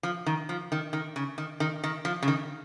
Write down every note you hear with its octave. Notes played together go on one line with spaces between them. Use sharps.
F3
D#3
F3
D#3
D#3
C#3
D#3
D#3
D#3
F3
C#3
D#3